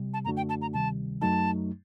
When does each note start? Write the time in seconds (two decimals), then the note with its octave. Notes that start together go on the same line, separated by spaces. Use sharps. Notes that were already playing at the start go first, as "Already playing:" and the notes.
Already playing: C3 G3
0.14 A5
0.25 F#2 D3 A3 D4 F#4 A#5
0.37 G5
0.49 A5
0.62 A#5
0.74 D2 C3 D#3 G3 A5
1.21 F#2 F#3 A3 D#4 A5